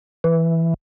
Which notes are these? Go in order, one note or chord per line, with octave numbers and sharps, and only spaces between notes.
E3